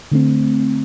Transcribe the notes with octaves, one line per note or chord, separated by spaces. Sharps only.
D3 A3 C4